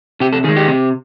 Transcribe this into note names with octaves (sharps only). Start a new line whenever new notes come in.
C3 G4
A4
D#3 G#3 G#4
G4
C3